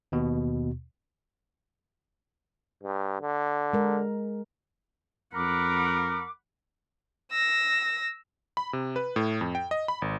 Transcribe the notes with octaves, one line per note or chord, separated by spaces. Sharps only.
D#2 B2
G2
D3
G#3 A#4
F2 A#4 F#5 B5 D6
E6 A#6
B5
C3
B4
A2
F2
G5
D#5
B5
G#1